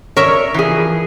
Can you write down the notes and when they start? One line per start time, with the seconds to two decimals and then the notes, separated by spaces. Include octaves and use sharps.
0.17 A#4 C#5 E5
0.54 E3 F3 G#4